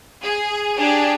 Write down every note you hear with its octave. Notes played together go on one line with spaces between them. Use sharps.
G#4
D4 G4 G#4